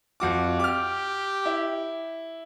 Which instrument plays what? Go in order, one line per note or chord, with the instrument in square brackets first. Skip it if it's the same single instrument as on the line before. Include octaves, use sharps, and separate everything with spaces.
[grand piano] F2 F#4 D6
[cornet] G4 [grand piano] D6 F6
[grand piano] E4